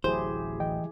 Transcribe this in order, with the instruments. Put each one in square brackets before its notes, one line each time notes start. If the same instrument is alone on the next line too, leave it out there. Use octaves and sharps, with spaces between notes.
[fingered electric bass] D1 A1 F#3 [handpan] E4 G4 G#4 [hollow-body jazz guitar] C5
[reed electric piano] E3 D#5 G5